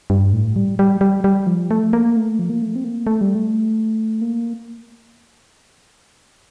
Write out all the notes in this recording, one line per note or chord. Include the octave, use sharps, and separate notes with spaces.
G2
A2
G3
G3
G3
G3
F3
A3
A#3
A3
F3
A#3
A3
C4
A#3
A3
G3
A3
A#3